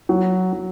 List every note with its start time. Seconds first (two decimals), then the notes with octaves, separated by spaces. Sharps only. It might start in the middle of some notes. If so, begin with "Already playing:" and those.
0.09 F#3
0.53 F#3